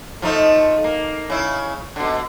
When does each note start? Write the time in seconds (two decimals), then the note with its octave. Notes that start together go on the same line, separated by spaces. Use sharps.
0.22 F3 A3 D#4
0.84 A#3
1.30 C#3 E4
1.96 B2 D3